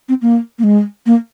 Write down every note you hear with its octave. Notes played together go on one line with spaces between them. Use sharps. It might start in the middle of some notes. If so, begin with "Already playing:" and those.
C4
A#3
A#3
G#3
A#3